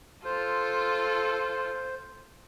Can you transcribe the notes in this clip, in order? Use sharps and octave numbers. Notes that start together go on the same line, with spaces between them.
F4 A4 C5